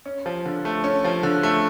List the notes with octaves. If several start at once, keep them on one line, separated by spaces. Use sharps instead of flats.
C#4
F3
D3
A3
C#4
F3
D3
A3